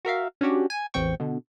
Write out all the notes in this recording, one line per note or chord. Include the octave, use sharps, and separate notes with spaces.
F#4 A#4 E5 F5
C#4 D4 F#4 G4
G#5
A1 E2 C4 G5 C#6
B2 D3